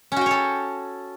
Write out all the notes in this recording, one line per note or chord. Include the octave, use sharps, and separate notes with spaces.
C#4 F#4 A4 C#5 G5